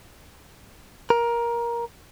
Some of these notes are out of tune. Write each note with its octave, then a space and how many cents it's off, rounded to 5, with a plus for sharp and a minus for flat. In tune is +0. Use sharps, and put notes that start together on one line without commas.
A#4 +15